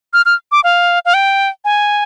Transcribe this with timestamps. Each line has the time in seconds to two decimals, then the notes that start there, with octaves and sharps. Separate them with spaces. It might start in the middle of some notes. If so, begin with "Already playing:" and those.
0.13 F6
0.26 F6
0.52 D6
0.64 F5
1.05 F5
1.14 G5
1.65 G#5